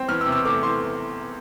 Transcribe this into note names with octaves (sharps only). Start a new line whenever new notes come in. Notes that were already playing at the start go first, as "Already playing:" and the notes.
Already playing: C4
E2 F6
E6
C3
E6
A3 D6
E3 C6